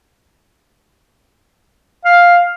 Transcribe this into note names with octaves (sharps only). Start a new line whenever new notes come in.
F5